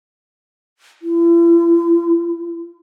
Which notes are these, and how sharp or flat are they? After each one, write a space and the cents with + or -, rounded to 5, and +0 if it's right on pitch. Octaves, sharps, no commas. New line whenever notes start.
E4 +45